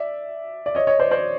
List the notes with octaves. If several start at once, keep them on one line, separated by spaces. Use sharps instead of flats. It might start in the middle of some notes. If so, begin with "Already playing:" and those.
Already playing: D5 E5
D5
C#5 D#5
C#5 D#5
C5 D5
C5 D5